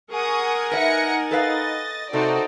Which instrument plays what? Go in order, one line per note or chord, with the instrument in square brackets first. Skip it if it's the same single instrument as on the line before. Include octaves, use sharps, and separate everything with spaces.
[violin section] G#4 C#6 D#6 [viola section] A#4 F#5 G#5
[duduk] D#4 [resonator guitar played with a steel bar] B4 D#5 E5 [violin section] A#6 C#7
[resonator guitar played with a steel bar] A4 B4 F5 [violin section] D#5 A6
[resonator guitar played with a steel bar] C3 [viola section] D#4 [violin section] F#4 C5 D5 [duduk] A4